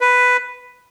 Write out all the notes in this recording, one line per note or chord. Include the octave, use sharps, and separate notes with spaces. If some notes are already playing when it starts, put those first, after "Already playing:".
B4